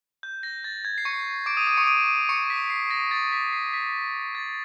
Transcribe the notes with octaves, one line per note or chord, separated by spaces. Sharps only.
G6
A#6
A6
G#6
C7
C#6 C#7
D6 D7
D#6 D#7
D#6 D#7
C#6 C#7
D#7
D6 D7
C#6 C#7
B6
C7
A#6
A6
B6
C7
B6
A6